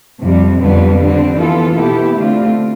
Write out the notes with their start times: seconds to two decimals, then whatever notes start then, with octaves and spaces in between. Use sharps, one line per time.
0.22 F2 C3 G3
0.61 F2 D3 G3 B3
1.00 D3 G3 C4
1.38 E3 B3 F4 A4
1.77 B2 B3 E4 G4
2.16 D3 A3 C4 F4